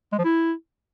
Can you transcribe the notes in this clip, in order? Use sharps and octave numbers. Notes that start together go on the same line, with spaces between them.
G#3
F3
E4